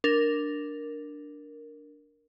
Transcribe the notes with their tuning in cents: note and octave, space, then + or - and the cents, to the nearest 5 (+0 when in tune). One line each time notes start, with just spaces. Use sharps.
D4 +0 A#4 +0